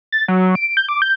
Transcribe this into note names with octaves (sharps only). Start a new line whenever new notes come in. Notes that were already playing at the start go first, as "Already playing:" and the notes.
A6
F#3
D7
G6
D6
G6